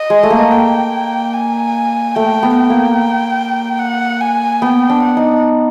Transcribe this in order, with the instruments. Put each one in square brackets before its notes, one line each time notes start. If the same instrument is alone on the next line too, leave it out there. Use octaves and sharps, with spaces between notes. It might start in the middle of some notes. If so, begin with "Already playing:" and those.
Already playing: [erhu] D#5
[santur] G#3
A3
A#3
[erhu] G5
G#5
[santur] A3 [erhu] G5
[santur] B3
[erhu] G5
[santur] A#3
[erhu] F#5
G#5
[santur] B3 [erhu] G5
[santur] D4
[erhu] F#5
[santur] D#4